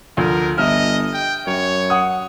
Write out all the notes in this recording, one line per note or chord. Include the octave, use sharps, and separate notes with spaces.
D2 F3 A#4
G1 D#5 E5 F6
G5
F#2 C#5
F#5 D#6